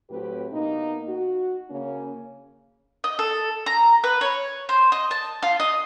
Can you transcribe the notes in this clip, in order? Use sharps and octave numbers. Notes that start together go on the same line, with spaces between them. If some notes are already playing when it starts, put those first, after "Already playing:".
A2 F#3 C4 G4 B4
B2 A#3 D#4
F#4
C#3 A#3 C#4
D#5
A4
A#5
B4
C#5
C5
D#5
A5
F4
D#5